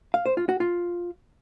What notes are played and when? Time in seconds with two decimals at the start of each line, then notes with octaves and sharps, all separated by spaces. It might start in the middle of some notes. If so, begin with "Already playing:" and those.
0.14 F5
0.26 C5
0.37 F4
0.49 F#4
0.60 F4